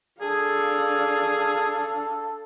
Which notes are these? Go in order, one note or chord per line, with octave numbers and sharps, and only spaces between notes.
D4 G#4 A4 F5